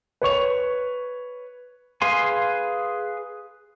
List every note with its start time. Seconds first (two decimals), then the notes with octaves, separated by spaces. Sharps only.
0.22 B4 C#5 C#6 F7
2.02 G#4 B4 F5 G#5 C6